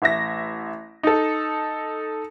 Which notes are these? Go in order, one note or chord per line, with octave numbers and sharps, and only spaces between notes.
A1 E5 A#6
D#4 A4